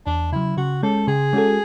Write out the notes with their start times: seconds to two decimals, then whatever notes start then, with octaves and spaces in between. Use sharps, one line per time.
0.06 E2 D4
0.32 C#3 F#3 E4
0.57 C#3 F#4
0.83 G#3 C#4 A4
1.07 C#3 G#4
1.33 G#3 C#4 F#4 A4